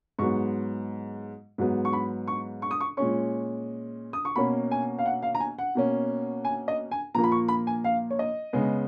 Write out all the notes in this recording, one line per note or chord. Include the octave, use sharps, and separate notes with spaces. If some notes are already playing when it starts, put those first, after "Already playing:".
G#2 F#3 B3 C#6
G#2 F#3 B3
C#6
B5
C#6
C#6
D#6
C#6
A#2 G#3 C#4 C#6
D#6
C#6
B2 A#3 C#4 B5
G#5
F5
F#5
F5
A#5
G#5
F#5
B2 A#3 C#4
G#5
D#5
G#5
A#2 F3 A#3 A#5
B5
C#6
B5
G#5
F5
C#5
D#5
C#3 G#3 B3